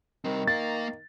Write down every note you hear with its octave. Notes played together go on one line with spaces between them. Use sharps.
D#3 G3 C4
A#3 F5 A6